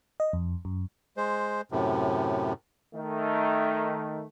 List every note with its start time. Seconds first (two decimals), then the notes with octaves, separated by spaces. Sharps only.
0.20 D#5
0.33 F2
0.65 F#2
1.17 G#3 C5
1.72 F#2 A2 C3
2.95 D#3 A3